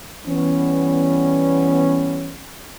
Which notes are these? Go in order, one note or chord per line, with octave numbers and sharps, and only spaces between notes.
E3 G3 B3 C#4